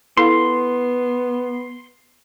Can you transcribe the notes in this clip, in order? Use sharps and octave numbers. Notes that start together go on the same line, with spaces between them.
B3 E4 A4 F5 C6